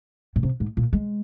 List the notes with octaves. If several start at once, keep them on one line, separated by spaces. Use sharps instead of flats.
A#2
C3
G#2
A#2
G#3